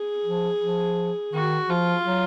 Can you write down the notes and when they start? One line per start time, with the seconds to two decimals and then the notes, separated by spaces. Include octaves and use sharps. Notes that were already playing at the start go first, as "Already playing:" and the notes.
Already playing: G#4
0.25 F3
0.61 F3
1.33 D#3 F#4
1.70 F3 F4
2.06 F#3